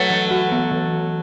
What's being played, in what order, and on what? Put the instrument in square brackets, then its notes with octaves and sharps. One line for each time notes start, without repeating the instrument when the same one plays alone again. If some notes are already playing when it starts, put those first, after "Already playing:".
Already playing: [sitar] F#3 A3 [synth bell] B4
[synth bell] E3
F#4
B3
E3